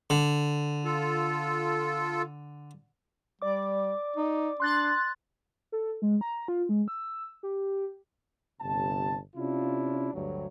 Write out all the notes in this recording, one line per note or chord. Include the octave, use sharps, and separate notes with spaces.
D3
F4 A4
G3 D5 D6
D#4
D4 C6 F#6 A6
A4
G#3
A#5
F4
G#3
E6
G4
G1 C3 A5
C3 C#4 D4 E4 F4
D2 G2 F#3